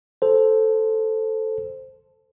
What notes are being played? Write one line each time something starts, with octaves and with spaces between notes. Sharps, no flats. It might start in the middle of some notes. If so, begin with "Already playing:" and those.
A4 C5